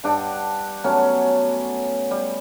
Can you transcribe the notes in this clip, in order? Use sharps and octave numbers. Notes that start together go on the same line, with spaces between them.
G2 D4 F#5 G5
F#3 A3 B3 C#4
G3